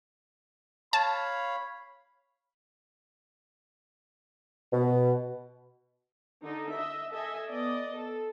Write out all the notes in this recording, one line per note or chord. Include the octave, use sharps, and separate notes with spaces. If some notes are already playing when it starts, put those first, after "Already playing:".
C#5 F5 A5 B5
B2
D3 D#4 A4
D#5 E5
A4 D#5 E5 G#5
B3 D5 D#5
A4